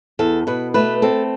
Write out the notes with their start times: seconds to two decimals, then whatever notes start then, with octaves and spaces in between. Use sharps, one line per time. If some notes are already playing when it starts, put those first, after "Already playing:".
0.19 E2 A4
0.47 B2 B4
0.74 A3 B4
1.02 C4 A4